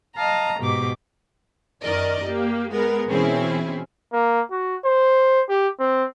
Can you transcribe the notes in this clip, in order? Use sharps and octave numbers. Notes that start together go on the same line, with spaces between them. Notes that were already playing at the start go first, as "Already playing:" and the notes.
D#5 F5 A5 A#5
G#2 B2 G4 D6
F#2 D#3 A#4 D5 D#5
A#3 G4
G#3 B3 A#4
B2 E3 C4 C#4 E4 G#4
A#3
F#4
C5
G4
C4